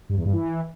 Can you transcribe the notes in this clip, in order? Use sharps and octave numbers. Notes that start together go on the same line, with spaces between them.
G2
E2
G2
E3